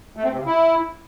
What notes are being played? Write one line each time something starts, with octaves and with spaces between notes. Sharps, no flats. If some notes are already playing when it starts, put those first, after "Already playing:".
A3
C4
C3
C#3
E4